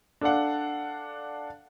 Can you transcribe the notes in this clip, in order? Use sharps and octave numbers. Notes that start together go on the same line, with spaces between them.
D4 A4 D5 F5 F#5